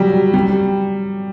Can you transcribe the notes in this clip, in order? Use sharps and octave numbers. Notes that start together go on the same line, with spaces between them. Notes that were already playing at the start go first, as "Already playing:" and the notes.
Already playing: F#3 G3
G3